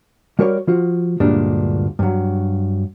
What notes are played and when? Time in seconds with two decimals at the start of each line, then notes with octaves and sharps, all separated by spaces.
0.39 G3 F#4 A#4 C#5 D5
0.67 F3 F4 F#4
1.20 D2 G2 A#2 G#3 D4 G4
1.99 G2 F#3